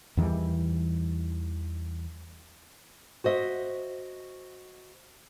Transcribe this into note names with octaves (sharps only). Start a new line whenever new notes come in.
E2 D#3 E3 G3
F#4 C5 D#5 E5